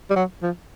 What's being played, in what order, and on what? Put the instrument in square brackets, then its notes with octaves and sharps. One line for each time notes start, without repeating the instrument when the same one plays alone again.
[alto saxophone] G3
F#3
F3